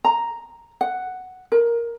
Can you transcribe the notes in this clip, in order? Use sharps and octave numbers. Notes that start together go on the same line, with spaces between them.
A#5
F#5
A#4